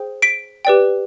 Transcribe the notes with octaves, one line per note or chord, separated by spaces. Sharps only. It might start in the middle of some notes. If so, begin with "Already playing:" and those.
Already playing: G#4 C5 G5
B6 D7
G4 B4 D5 G5